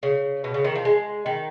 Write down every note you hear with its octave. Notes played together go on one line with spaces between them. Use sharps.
C#3
B2
C#3
D#3
F3
G#3
D#3